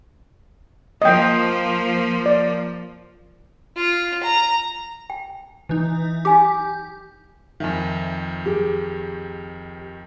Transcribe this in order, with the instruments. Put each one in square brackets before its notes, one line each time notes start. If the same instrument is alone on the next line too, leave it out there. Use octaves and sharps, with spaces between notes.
[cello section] F3 A#3 [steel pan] D#5 G5
[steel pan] D5
[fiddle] F4
A#5
[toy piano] G5
[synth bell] E3 D#4
[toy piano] D#4 G#5 D6 [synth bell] G4
[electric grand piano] F2 D#3 [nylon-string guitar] E5 G#5
[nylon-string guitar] G4 G#4